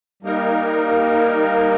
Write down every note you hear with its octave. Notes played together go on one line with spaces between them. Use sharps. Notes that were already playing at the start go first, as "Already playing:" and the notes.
G3 A#3 D#4 A#4